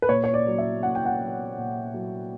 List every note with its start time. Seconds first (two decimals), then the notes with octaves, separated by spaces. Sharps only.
0.02 B4
0.09 A#2 C#5
0.24 C#5
0.34 D5
0.47 F#3
0.58 E5
0.83 A#2 F#5
0.95 G5
1.06 F#5
1.21 F#3
1.58 A#2
1.94 F#3